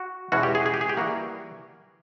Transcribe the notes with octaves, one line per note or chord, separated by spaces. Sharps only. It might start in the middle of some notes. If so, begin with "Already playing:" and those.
Already playing: F#4
E2 B2 G#3 C#4 F#4
G4
G#4
G#4
G4
G#4
G4
E3 G3 A#3 F#4